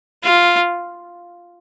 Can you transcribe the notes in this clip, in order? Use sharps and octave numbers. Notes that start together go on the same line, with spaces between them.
F4